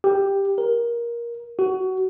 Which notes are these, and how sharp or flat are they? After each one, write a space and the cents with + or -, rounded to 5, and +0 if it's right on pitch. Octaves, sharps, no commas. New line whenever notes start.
G4 +5
A#4 +15
F#4 +20